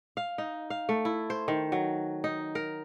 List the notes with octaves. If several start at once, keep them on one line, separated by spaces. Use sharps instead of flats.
F5
D#4
F5
A3
E4
C5
D#3
F#3
D#4
A#4